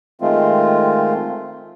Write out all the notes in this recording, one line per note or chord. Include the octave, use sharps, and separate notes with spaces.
D#3 G#3 A3 C4 F4